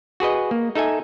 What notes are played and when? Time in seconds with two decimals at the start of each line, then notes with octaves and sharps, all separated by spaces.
0.20 F#4 G#4 B4 D#5
0.51 A#3
0.75 D#4 A4 E5 G#5